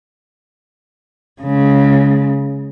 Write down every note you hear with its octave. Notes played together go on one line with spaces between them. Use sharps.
C#3 G#3